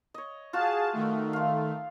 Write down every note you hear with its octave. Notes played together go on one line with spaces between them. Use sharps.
C#5 D#5
F4 F#4 G#4 F5 A5
D#3 A3
F5 C6